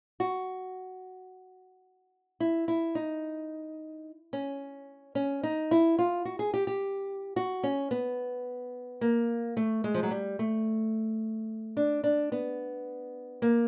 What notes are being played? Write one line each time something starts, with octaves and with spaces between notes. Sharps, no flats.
F#4
E4
E4
D#4
C#4
C#4
D#4
E4
F4
F#4
G#4
G4
G4
F#4
C#4
B3
A#3
A3
G#3
F3
F#3
G3
A3
D4
D4
B3
A#3